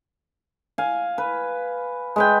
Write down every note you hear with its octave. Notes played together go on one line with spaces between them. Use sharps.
F5 G#5
B4
G#3 B4 G5